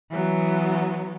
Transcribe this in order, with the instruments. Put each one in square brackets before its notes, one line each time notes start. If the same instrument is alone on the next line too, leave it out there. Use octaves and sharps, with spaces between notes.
[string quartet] E3 F#3 B3